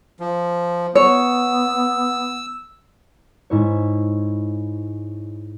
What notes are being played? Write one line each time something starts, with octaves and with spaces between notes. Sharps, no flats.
F3
B3 C#5 E6
G#2 E4 C#5